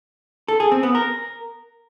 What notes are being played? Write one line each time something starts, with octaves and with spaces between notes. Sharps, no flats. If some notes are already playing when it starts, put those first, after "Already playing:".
A4
G#4
C4
B3
A#4